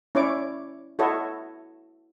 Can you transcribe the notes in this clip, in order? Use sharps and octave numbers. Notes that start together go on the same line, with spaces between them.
C#4 E4 C#5 D5 D6
E4 F#4 A4 C#5 D#5